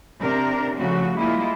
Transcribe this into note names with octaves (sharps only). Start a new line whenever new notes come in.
C3 D4 A#4
C#3 F3 A3 F#4
G3 G#3 A#3 E4 F4